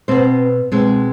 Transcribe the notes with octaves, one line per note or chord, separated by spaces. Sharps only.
B2 B3 C4 C5
B2 G#3 C4